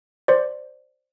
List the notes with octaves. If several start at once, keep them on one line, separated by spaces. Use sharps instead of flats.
C5 D5